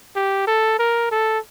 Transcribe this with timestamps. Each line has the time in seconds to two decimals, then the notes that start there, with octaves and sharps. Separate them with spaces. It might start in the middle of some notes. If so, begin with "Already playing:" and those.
0.16 G4
0.47 A4
0.79 A#4
1.11 A4